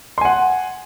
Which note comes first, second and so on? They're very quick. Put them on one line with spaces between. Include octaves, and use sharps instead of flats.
C6 G#5 F#5